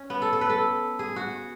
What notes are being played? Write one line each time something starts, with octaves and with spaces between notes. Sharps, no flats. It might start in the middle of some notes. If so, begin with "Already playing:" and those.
Already playing: C#4
B3
A4
A4
B4
A4
G#4
F#4